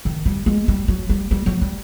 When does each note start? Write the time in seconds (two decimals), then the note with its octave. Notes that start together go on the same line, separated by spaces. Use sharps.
0.05 D#3
0.26 G3
0.46 G#3
0.68 G3
0.88 F#3
1.09 G3
1.31 G3
1.46 F#3
1.62 G3